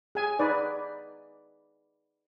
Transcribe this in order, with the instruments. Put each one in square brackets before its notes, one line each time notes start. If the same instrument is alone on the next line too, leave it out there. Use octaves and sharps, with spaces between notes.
[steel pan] G#4 G#5
D#4 B4 D5